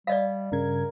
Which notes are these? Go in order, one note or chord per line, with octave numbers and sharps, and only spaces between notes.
G3 D5 D#5 F5
G2 C#3 A#4 G#6